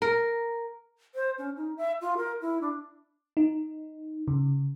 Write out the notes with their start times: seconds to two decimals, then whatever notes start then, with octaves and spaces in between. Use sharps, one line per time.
0.02 A#4
1.15 C5
1.38 C#4
1.57 D#4
1.77 E5
2.01 F4
2.17 A#4
2.41 E4
2.61 D4
3.37 D#4
4.28 C#3